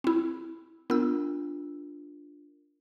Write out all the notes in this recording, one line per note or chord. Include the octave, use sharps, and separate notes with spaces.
C4 E4
B3 D4 F4 A#4 E6